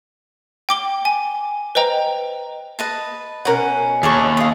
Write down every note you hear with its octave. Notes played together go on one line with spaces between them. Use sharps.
G5 D6 G7
G#5
B4 C5 D#5 G5 A#5
B4 D#5 A5
B2 C#4 A#4 F#5
D#2 A3 G#4 D5 A5 C#6
F5 D#6